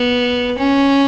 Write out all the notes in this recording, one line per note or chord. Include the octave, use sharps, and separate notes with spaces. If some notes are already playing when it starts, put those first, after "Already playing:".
Already playing: B3
C#4